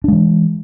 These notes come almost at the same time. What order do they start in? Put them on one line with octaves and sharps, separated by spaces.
D4 G#3 E3